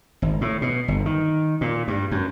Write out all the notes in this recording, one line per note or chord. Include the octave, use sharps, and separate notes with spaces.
G#1
A2
B2
G1
D#3
A#2
G2
F#2